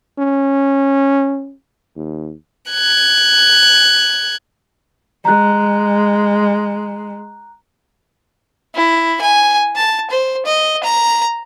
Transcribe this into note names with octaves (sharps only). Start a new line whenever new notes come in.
C#4
D#2
F#6 G#6
G#3 A#5 F#6
E4
G#5
A5
C5
D#5
A#5